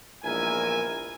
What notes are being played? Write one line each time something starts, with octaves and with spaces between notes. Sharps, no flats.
A#1 E2 G#2 A#4 E5 G#5